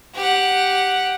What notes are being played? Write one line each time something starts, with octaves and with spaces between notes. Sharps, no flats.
G4 F#5